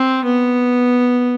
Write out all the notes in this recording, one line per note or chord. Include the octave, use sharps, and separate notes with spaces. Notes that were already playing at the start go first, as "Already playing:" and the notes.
Already playing: C4
B3